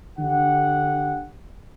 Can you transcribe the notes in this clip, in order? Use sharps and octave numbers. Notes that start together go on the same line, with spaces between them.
D3 G4 F#5